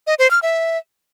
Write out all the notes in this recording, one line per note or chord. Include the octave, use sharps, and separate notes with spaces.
D#5
C5
F6
E5